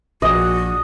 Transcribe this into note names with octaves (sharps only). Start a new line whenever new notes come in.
A#1 D4 F#4 G#4 D#5